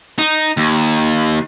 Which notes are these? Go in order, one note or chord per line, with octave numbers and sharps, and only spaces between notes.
D#4
D#2